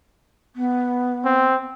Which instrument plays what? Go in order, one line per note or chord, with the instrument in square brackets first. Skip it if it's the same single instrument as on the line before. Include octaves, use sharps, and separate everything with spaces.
[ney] B3
[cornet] C4